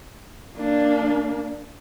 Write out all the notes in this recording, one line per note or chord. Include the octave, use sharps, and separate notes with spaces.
A#3 D4